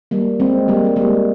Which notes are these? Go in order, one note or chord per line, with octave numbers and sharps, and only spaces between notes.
G3 A#3
G#3 C4
G3 A#3
G#3
G3 A#3